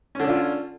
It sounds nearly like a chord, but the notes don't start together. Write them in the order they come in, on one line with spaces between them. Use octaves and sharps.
C#4 D3 D4 F4